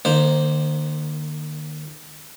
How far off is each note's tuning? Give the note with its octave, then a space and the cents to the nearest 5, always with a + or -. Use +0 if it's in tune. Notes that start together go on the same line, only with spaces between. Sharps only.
D#3 -40 A#3 +0 C5 +0